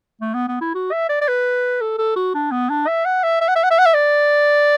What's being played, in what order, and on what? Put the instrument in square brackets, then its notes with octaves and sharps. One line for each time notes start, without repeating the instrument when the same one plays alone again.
[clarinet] A3
B3
B3
E4
F#4
E5
D5
D5
B4
A4
A4
F#4
D4
B3
D4
E5
F#5
E5
E5
F#5
E5
F#5
E5
F#5
E5
D5